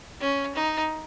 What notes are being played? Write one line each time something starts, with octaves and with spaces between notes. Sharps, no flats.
C#4
D#4